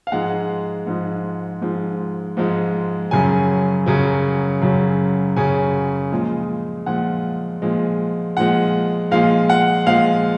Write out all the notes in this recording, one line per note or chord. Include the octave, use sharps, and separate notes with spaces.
F5
G#2 F3 G#3 F#5
G#2 F3 G#3
G#2 F3 G#3
G#2 F3 G#3
F#2 C#3 F#3 G#5
F#2 C#3 F#3
F#2 C#3 F#3
F#2 C#3 F#3 G#5
A#2 F3 G#3
A#2 F3 G#3 F#5
A#2 F3 G#3
A#2 F3 G#3 F#5
A#2 F3 G#3 F5
F#5
A#2 F3 G#3 F5